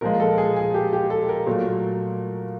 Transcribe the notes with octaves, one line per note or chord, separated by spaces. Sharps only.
A#2 F3 G#3 A#4
A4
G#4
G#4
G4
G4
A4
A#4
A#2 F#3 A3